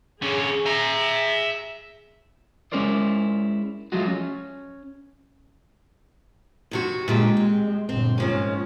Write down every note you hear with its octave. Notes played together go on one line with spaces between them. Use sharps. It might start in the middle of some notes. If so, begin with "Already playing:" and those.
D3 C#4 G#4
E5 A#5
G#3 C#4 E4 A#4 C5 D5
F3 F#3 G#3 A3 F4 F#4
C#4
D#2 C3 F#4
A#2 D3 G#3 G4
C4
G1 A#2 C4
G#2 C3 F3 A#3 C#4